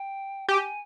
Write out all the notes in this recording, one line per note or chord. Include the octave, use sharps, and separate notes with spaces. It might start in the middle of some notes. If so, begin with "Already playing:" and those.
Already playing: G5
G4 G#5